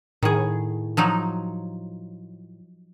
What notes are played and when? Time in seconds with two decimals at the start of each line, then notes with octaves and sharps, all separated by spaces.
0.23 A2 D#3 G#4
0.97 F3 F#3 D#4